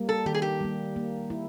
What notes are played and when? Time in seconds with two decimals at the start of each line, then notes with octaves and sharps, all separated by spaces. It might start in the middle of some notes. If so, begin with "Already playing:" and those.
Already playing: G3 A#3
0.09 A4
0.26 D#3 G4
0.34 G#4
0.42 G4
0.61 G3 A#3
0.96 A#3
1.30 E4